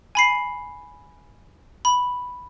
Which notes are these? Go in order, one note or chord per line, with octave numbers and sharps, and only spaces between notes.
G#5 B5 C7
B5